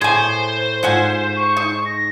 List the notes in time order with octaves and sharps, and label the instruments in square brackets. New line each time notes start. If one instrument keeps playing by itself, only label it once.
[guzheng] A2 C6 [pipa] G#4 G#5 [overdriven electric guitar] C5
[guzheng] G#2 [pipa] F4 F#5 G#5
[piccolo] C#6
[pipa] D#4
[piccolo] A#6